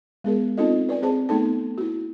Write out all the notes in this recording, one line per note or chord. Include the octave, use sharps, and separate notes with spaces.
G#3 B3 G#4 A#4
C4 C#4 D#4 F4 A4 D#5
B4 D5 G#5
C4 G#4 C5 A5
A3 B3 D#4 A4 A5
E4 F#4